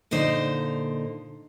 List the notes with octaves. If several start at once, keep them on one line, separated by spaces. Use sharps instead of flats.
A#2 D3 D#4 C5